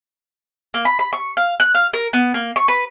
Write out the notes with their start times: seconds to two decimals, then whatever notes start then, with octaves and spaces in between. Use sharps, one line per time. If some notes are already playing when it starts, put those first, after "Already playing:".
0.74 A#3
0.85 B5
0.99 B5
1.13 C#6
1.37 F5
1.60 F#6
1.74 F5
1.93 A#4
2.13 B3
2.34 A#3
2.56 C#6
2.68 B4